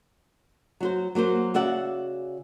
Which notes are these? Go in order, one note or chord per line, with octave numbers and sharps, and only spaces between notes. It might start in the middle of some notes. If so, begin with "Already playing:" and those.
F#3 F#4 C5
F#3 A#3 F#4 C5
C#3 F#4 D5 E5 F#5